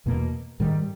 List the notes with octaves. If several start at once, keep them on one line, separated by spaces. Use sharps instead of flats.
E2 B2 A#3
G#2 D#3 G3